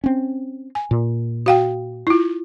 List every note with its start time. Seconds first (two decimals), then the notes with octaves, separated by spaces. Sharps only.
0.04 C4 C#4
0.75 G#5
0.91 A#2
1.46 F#4 F5 G5
2.07 E4 F4